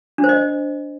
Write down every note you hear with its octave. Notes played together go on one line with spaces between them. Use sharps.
D4
C5
D#5